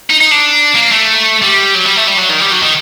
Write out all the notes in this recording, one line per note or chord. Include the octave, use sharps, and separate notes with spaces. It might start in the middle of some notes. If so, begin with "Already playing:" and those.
D#4
D#4
D4
A#3
A3
G3
F#3
G3
A3
G3
F#3
D#3
G3
F#3
D#3